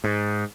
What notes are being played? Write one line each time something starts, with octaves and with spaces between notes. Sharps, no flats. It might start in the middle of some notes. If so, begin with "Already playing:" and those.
G#2